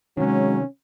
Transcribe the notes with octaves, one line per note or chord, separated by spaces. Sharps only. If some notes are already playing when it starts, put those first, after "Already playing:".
C3 D#3 F#3 G#3 C#4